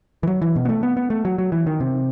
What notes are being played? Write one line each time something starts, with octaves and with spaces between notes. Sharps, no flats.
E3
F#3
E3
B2
B3
A3
B3
B3
A3
F#3
F#3
E3
D#3
C3